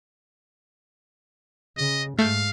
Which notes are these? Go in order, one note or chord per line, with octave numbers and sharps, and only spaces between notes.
C#3 D#5
G#2 A3 F5 G6